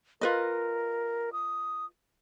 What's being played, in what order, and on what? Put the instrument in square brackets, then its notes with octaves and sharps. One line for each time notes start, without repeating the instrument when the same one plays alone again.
[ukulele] F4 B4 D#5 [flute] A#4
[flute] D#6